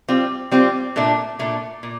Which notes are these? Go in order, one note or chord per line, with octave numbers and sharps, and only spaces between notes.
G3 C4 F4
G3 C4 F4
A#2 A3 D4
A#2 A3 D4
A#2